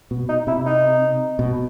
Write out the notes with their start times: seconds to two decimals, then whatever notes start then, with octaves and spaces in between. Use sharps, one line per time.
0.11 B2
0.29 D#4
0.47 C3 E4
0.66 D#4
1.39 B2